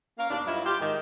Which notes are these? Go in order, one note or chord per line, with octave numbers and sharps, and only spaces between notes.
A#3 C#4 A#4 F5
D#2 B2 D4
G2 F#3 E4 F4 D#5
F4 G4
G#2 D#3